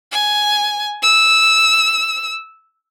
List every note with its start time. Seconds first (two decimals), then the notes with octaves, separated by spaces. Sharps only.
0.12 G#5
1.02 E6